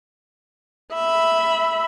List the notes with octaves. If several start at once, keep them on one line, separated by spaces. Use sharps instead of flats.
E5 B5